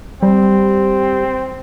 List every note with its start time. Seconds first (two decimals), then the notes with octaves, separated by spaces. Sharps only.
0.23 G3 C4